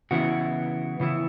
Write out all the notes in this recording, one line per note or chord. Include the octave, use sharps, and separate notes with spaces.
C#3 E3 B3 E4 F#4
C#3 E3 B3 E4